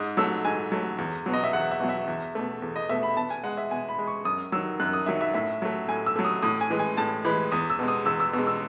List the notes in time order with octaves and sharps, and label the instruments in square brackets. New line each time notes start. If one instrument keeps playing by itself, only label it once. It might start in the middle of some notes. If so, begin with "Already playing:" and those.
Already playing: [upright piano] G#2 D#6
F#3 A3 E6
G#2 G#5
F#3 A3
E2
B2 F#3
D#5
E5
E2 F#5
E5
B2 F#3
E5
E2
B2 A3
E2
D#5
B2 A3 E5
B5
B2 A5
G#5
G#3 F#5
E5
B2 G#5
B5
G#3
C#6
F#2 D#6
D#3 F#3 E6
F#2 F#6
D#6
D#3 F#3 E5
E5
A2 E5
F#3 A3
A2 G#5
E6
F#3 A3
D#6
A2 D#6
G#5
E3 G#3
G#5
A2 A5
E3 G#3 B5
E2 D#6
E6
B2 G#3
D#6
E2 E6
E6
B2 G#3 E6
E6